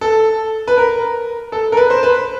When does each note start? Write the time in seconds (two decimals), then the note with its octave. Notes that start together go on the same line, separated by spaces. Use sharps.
0.01 A4
0.68 B4
0.78 A#4
1.52 A4
1.72 A#4
1.77 B4
1.90 C5
2.03 B4